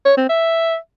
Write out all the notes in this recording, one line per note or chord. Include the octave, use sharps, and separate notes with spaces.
C#5
C4
E5